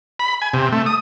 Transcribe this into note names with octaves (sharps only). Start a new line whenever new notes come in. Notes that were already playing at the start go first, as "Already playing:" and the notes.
B5
G#5
C3
A3
D#6